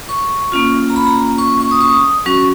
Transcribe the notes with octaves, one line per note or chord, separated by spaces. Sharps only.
C#6
A#3 C#4 F4
A#5
B5
A#5
C#6
C#6
D#6
C#6
D#6
F#3 C#4 F#4 C#6